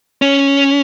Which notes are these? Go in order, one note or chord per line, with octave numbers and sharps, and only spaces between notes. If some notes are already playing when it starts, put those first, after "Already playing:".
C#4